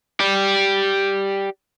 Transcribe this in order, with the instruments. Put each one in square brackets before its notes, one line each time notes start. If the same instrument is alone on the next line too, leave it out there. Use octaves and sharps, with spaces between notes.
[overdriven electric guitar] G4 D5